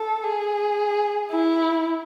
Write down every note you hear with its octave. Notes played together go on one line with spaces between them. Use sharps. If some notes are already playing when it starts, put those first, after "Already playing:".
Already playing: A4
G#4
E4